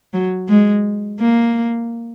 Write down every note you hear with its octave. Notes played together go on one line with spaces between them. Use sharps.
F#3
G#3
A#3